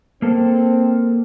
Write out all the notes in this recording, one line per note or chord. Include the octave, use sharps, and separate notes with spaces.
A#3 C4 A4